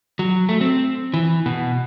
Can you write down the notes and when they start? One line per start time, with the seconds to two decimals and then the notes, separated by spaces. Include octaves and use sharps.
0.19 F#3
0.49 A3
0.61 C4
1.14 E3
1.46 B2